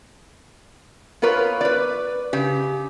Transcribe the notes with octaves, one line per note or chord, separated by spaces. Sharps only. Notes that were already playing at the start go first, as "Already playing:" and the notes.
B3 F4 A#4 B4 C#5
B4 D5
C#3 G4